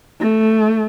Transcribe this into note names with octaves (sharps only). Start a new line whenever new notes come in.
A3